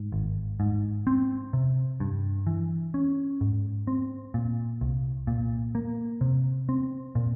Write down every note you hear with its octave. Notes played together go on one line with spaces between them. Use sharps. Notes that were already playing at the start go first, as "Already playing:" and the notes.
Already playing: G#2
G#1
G#2
C4
C3
G2
E3
C#4
G#2
C4
A#2
C2
A#2
A#3
C3
C4
A#2